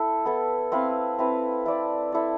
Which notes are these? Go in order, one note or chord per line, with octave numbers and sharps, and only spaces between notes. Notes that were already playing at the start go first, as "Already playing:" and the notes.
Already playing: E4 A4
B3 E4 A4
C4 E4 B4 F5
C4 E4 B4 F5
E4 A4 D5
E4 A4 D5